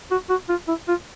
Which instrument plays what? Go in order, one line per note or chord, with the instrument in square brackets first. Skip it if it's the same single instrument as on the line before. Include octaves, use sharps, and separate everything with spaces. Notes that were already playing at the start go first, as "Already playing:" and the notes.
[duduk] F#4
F#4
F4
E4
F4